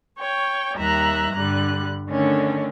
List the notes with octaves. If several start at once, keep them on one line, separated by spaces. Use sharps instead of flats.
C#5 G5 C#6
D#2 G3 E5 A#5 F#6
G2 D3 G3 F#6
D3 D#3 A3 C#4 D4